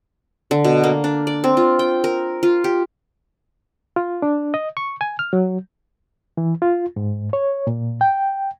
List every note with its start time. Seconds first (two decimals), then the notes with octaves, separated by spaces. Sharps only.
0.51 D3
0.64 B2
0.84 A#3
1.04 D4
1.27 D5
1.44 C4
1.57 F4
1.79 G5
2.04 A#4
2.43 F4
2.64 G4
3.96 F4
4.22 D4
4.54 D#5
4.77 C#6
5.01 G#5
5.19 F6
5.33 F#3
6.37 E3
6.62 F4
6.96 G#2
7.33 C#5
7.67 A#2
8.01 G5